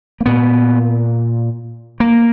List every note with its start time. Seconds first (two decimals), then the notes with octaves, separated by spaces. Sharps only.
0.21 A#3
0.26 A#2 B3
2.00 A#3